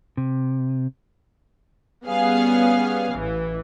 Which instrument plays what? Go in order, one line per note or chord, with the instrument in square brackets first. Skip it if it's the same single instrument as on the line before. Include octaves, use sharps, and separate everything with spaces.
[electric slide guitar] C3
[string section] G3 B3 C#4 G#4 F5
A1 E3